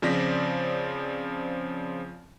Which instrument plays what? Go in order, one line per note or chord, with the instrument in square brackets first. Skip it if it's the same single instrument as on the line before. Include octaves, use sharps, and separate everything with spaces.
[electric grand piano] C#3 F3 C4 D5 A#6 B6